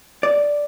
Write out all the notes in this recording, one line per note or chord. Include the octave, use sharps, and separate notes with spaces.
D5